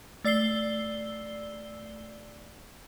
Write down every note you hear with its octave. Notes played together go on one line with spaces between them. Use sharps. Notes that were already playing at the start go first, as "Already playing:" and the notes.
A3 D5 E6 C7 G7